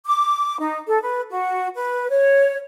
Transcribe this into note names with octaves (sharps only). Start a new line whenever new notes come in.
D6
D#4
A4
B4
F#4
B4
C#5